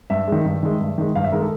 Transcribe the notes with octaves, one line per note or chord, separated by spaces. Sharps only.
G2 E5
D#3 G#3
G2
D#3 G#3
G2
D#3 G#3
G2 F5
E5
D#3 G#3 A#4
A4